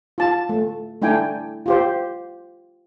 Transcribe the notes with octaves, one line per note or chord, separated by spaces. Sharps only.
F4 A5
A3
A3 D4 E4 G5 G#5
F4 G4 C5